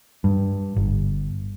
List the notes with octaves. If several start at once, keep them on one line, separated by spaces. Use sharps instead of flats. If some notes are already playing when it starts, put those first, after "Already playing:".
G2
G1